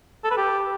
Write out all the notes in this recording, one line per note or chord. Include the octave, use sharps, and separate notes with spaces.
A4
B4
G4